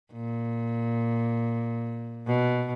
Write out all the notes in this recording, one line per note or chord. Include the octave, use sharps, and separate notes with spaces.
A#2
B2